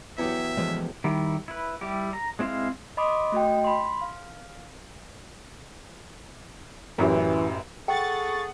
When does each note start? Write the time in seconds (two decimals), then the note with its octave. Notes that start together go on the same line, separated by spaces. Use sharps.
0.18 E2 F#3 G4 G#4 E5
0.57 C#3 E3 F3 G#3 A3
1.04 D#3 G3 E4
1.48 E4 B4
1.81 G3 E4 G4
2.13 A#5
2.39 G#3 C4 E4 C5 F5
2.97 D#5 B5 C6 D6 D#6
3.32 A3 F#4 D#5 G5
3.64 B5 C6
4.01 F5
6.99 A1 F#2 E3 G4
7.88 G#4 A4 F#5 G5 C#6 A6